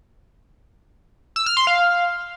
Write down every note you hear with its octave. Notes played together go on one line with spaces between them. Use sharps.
E6
F6
C6
F5